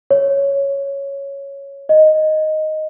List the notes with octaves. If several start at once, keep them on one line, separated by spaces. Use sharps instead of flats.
C#5
D#5